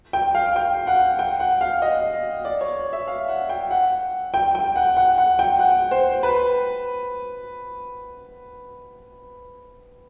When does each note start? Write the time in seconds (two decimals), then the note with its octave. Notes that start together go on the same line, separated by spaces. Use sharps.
0.13 G5
0.35 F5
0.56 G5
0.87 F#5
1.19 G5
1.40 F#5
1.61 F5
1.82 D#5
2.45 D5
2.61 C#5
2.93 E5
3.07 F5
3.28 F#5
3.49 G5
3.71 F#5
4.34 G5
4.55 G5
4.76 F#5
4.97 F#5
5.18 F#5
5.39 G5
5.59 F#5
5.91 C5
6.23 B4